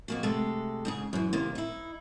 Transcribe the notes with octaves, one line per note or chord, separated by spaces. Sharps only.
F2 A#3 F#4
C3 G#3 A3 A4
G#2 C#3 G#4
F#2 E3
C3 D#3 A#3
D#4 E4